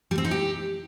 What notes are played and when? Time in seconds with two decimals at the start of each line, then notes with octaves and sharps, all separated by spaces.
0.11 G3
0.18 C4
0.25 D#4
0.31 G4